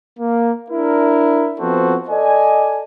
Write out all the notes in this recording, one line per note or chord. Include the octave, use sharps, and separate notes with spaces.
A#3
D4 E4 A#4
F3 B3 C4 F#4 A4 C5
A4 D5 D#5 G#5